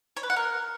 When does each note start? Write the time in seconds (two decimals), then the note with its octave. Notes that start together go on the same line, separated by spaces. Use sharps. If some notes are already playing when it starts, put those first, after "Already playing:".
0.17 C#5
0.23 B4
0.30 F#5
0.36 A#4